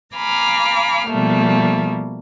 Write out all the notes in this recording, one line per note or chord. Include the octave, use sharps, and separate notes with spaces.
F5 G#5 A#5 B5 D6 F6
B2 F3 G3 A3 A#3